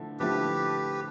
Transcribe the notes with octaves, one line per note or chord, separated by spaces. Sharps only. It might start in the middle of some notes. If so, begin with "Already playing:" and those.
Already playing: D3 F3 A3 E4
D3 F3 A3 E4 G4 B4